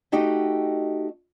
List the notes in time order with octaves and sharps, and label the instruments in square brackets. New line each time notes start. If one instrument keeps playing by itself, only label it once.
[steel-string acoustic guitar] A3 D#4 F#4 G4 D#5